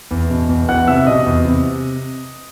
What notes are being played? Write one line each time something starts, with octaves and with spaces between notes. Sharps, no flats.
E2
B2
E2
E3 F#5 F#6
C3 E5 E6
B2 D#5 D#6
E2
C3